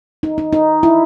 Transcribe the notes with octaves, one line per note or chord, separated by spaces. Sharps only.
D#4
D#4
D#4
E4